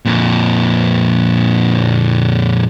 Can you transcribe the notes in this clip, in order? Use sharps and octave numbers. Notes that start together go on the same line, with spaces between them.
F2 A#2